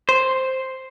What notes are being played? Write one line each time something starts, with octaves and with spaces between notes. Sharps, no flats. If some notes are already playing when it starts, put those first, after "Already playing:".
C5